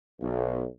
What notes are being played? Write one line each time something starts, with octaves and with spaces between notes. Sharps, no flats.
B1